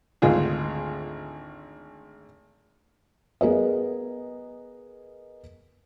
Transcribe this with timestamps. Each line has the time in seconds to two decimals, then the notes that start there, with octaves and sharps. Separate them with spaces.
0.22 G#1 D2 F4 G#4
3.41 B3 G#4 A#4 D#5